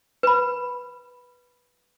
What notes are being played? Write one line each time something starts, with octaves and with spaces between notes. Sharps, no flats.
B4 B5